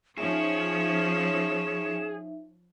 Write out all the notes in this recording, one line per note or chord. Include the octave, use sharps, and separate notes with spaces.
F3 C#4 D#4 G#4 C#5 E5 E7